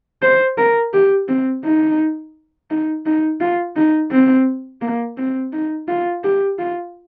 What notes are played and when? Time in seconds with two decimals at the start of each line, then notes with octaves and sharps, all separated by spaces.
0.22 C5
0.58 A#4
0.93 G4
1.28 C4
1.65 D#4
2.71 D#4
3.06 D#4
3.41 F4
3.76 D#4
4.12 C4
4.82 A#3
5.17 C4
5.53 D#4
5.88 F4
6.24 G4
6.59 F4